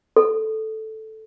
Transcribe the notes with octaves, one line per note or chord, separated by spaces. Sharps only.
A4